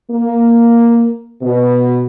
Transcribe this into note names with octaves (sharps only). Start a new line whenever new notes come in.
A#3
B2